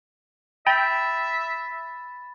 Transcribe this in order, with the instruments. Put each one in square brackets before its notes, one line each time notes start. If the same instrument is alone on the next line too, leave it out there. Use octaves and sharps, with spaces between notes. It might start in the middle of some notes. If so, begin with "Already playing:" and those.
[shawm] E5 [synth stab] G5 [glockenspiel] B5 A6